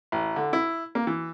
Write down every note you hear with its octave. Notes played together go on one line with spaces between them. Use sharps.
A1
D3
E4
A#3
E3